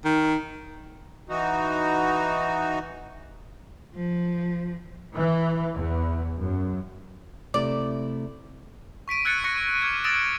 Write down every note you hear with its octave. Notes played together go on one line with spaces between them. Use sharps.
D#3
E3 D#4 F#4
F3
E3
E2
F#2
C3 A3 E4 D5
C#6 B6 D7 D#7
E6 F#6 G#6 A6 C#7
C#6 F#6 A#6 B6 C#7
D6 F6 G#6 E7
D#6 E6 A6 A#6 D7 E7